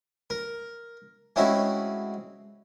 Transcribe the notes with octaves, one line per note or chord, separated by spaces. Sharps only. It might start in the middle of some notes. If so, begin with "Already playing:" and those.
A#4
G#3 A3 C4 C#4 E4 F#4